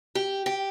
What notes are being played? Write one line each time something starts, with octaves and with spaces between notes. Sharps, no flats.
G4
G4